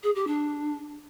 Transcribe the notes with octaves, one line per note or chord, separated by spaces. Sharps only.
G#4
G4
D4